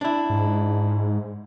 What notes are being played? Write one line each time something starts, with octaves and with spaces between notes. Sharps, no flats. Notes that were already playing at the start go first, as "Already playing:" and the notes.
D4 E4
G#2